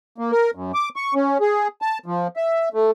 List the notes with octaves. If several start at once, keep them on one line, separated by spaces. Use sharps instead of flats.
A#3
A#4
F#2
D6
C#6
C#4
G#4
A5
F3
E5
A3